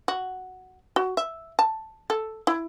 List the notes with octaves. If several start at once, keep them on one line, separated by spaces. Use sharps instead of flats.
F#4
F#4
E5
A5
A4
E4